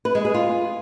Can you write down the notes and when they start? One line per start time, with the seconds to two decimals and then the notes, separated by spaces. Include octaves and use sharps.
0.05 B4
0.15 G#3
0.25 G#4
0.34 F4